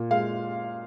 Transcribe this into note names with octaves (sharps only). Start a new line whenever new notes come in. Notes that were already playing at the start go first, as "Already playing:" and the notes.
Already playing: A#2
G#3 F5